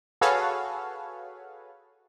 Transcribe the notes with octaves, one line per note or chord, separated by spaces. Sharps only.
F#4 G#4 A4 B4 C#5 F5